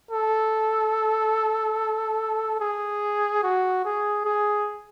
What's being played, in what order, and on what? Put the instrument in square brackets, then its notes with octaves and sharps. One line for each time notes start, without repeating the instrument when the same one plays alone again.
[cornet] A4
G#4
F#4
G#4
G#4